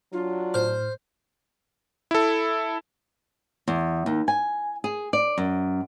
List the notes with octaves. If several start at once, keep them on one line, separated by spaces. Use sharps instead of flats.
F#3 D4 F4
A2 C5 F6
E4 A4
E2
D#2
G#5
G#4
D5
F#2